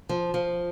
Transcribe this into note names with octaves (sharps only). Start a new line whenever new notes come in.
F3
F3